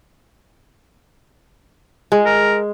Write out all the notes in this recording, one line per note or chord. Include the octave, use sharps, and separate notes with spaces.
G#3
A#4